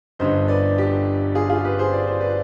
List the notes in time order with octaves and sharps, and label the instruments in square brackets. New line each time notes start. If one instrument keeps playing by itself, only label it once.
[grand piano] G1 G2 D3 C5 D#5
B4 D5
G4
F4 G#4
F4 G#4
G4 B4
G#4 C5
D5
C5
B4 D5